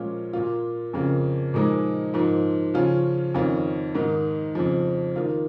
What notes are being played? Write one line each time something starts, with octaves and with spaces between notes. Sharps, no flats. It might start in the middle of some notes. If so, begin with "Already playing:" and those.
Already playing: A#2 F3 G#3 C#4 F4
A#2 A#3 F4
F2 C#3 A#3 F4
A#2 F3 G#3 D#4
G#2 F3 A#3
C#3 F3 C#4 F4
F2 D#3 C#4 F4
G#2 D#3 A#3 D#4
F2 C#3 F3
D#3 A#3 F4